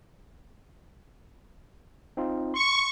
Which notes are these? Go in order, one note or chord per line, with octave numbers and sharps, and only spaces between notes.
C4 D#4 F4
C6 C#6